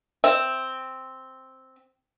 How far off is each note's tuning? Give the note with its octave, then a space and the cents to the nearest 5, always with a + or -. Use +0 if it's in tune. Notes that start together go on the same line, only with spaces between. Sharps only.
C4 +0 E5 +0